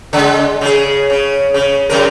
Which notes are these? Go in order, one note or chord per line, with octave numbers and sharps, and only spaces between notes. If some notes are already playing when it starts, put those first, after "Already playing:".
C#3 G#3
C#3 G#4
C#3
C#3
F#2 C#3 A#4